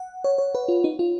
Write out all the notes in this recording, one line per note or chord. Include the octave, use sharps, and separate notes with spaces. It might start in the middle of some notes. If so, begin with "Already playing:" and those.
Already playing: F#5
C#5
C#5
B4
F4
D#4
F4